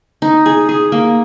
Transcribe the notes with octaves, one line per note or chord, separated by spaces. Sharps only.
D#4
G#4
G#4
A#3